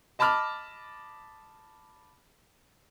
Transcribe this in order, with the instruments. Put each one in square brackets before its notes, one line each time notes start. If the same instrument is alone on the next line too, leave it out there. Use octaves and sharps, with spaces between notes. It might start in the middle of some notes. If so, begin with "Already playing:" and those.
[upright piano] D#5 A5 B5 D6 F6